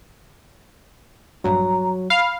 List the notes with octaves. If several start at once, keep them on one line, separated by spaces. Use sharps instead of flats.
A#1 G2 F#3 A#5
F5 B5